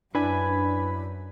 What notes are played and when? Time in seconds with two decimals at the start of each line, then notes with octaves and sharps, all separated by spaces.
0.15 F#2 D4 E4 B4 G#5 B5